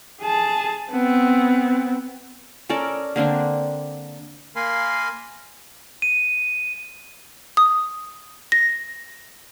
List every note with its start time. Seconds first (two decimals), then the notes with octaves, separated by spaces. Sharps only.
0.21 G#4 A5
0.91 B3 C4
2.69 C#4 A4 A#4 D5
3.16 D3 A#3 C4 D4
4.56 A#3 A#4 F5 G#5 B5 C6
6.02 D#7
7.57 D#6
8.52 A#6